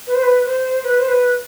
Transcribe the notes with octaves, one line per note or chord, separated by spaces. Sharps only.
B4
C5
B4
C5
B4
C5
B4